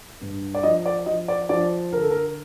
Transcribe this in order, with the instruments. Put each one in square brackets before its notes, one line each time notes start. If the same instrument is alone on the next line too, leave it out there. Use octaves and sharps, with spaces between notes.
[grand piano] G2
D5
F3 D#5
D5
F3 D#5
D5
F3 D5
D3 A#4
A4
A#4